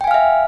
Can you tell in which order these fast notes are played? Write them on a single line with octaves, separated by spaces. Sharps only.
G5 G#5 F5 F6 E5